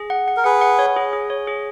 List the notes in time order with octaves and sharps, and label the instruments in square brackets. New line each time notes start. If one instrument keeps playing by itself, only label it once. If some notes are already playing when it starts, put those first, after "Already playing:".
Already playing: [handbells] G#4
F#5
F#5
[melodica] A#4
[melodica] G#4 B4 [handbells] F#5
[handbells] F#5
C#5
G#4
G#4
C#5
G#4